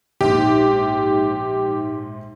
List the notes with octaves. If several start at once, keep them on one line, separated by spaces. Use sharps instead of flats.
A#1 G#2 D#4 G4